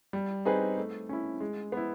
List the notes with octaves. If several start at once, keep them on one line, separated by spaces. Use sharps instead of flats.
G3
C4 D#4 G#4 B4
A3
C#4 E4
G#3
B3 E4